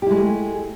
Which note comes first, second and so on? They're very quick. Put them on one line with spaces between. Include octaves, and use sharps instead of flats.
G4 E4 G#3 A3